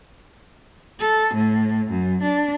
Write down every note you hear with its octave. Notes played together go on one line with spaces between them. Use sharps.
A4
A2
F#2
D4